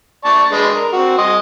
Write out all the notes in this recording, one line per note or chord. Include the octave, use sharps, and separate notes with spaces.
D5 A5 C#6
G#3 D4 B4
A#4
C4 F#4
D#5 C6